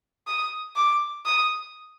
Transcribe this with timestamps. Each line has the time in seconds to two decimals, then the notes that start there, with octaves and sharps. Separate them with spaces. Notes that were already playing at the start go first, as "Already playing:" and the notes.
0.27 D#6
0.76 D6
1.26 D#6